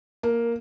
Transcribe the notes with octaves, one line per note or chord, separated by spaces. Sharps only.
A#3